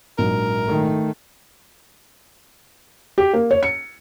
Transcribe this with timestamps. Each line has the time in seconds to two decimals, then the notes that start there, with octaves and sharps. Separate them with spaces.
0.18 A#1 G#2 F#3 A#4
0.66 D#3 A3
3.18 G4
3.34 A#3
3.51 C#5
3.63 C#7